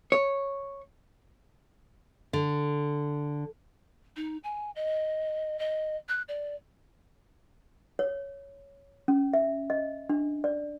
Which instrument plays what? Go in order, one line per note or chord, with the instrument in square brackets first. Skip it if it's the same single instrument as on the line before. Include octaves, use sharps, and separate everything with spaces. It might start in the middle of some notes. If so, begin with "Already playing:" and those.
[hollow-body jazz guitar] C#5
[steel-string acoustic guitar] D3
[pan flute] D#4
G#5
D#5
D#5
F#6
D5
[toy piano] C#5
C#4
E5
D#5
D4
D5